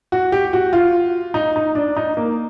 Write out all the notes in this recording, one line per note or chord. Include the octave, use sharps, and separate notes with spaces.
F#4
G4
F#4
F4
D#4
D#4
D4
D#4
A#3